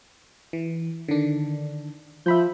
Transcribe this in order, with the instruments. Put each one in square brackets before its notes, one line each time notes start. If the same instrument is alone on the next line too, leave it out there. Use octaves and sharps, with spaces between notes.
[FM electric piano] E3
D3 D#3 D4
[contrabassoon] F3 [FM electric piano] E5 B5 G6